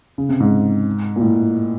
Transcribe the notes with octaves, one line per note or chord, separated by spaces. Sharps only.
C#3
C3
G#2
A#2
A2